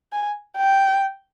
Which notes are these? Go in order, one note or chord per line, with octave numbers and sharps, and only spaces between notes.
G#5
G5